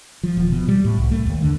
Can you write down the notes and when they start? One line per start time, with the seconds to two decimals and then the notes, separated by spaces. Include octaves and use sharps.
0.23 F3
0.37 D#1
0.52 B2
0.68 G3
0.85 A2
0.99 C2
1.11 A3
1.26 D#2
1.42 D3